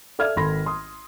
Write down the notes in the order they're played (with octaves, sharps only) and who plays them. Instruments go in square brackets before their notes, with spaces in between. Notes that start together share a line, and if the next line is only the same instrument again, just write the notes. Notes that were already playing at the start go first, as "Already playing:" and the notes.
[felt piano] A4 D5 E5 F6 G#6
G#1 A4 B5 C6 A#6
C6 D#6